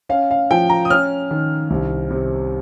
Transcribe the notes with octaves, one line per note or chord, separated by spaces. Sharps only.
C#4 F5
F5
F3 G5
A#5
D#6
C#4 F6
D#3
C2
C3